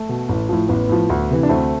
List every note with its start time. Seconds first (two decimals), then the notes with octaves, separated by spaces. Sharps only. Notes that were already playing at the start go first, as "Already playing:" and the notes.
Already playing: A3
0.09 B2
0.29 A1
0.49 A2 F3
0.69 A1 B3
0.89 A2 F3
1.10 D2
1.30 C3 E3
1.43 D4
1.49 D2 A3 C4